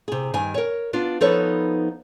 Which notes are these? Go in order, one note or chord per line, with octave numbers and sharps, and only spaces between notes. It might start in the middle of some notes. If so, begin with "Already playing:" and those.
C3 G#4
G2 D#3 G#5
A#4 C#5
B3 D4 F4
F3 B3 D#4 A4 B4 C#5